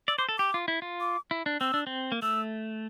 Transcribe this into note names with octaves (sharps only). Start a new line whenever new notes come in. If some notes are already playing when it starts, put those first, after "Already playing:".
D5 E6
C5 D6
A4
G4 D6
F4
E4
F4
D6
E4
D4
C4 E6
D4
C4
A#3
A3 E6